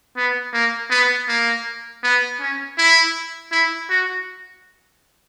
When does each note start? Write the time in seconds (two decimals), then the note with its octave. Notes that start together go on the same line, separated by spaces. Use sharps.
0.17 B3
0.53 A#3
0.90 B3
1.28 A#3
2.04 B3
2.40 C#4
2.77 E4
3.52 E4
3.90 F#4